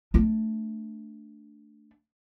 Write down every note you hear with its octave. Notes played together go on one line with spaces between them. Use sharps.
A3 D4